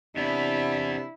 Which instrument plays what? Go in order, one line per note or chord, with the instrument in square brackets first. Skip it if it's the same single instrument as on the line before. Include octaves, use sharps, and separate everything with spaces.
[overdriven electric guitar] E2 B3 [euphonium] C3 [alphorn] D4 [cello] E4